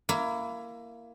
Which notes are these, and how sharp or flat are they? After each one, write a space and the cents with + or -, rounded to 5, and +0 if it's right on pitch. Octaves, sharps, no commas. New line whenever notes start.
A#3 +0 E4 +20